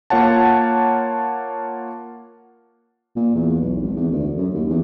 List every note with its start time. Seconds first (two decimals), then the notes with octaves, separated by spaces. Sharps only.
0.10 A#3 F4 C#5 F#5 A5
3.16 A#2
3.35 E2
3.61 B1
3.82 G#1
3.96 E2
4.11 D2
4.37 F#2
4.54 D#2
4.69 E2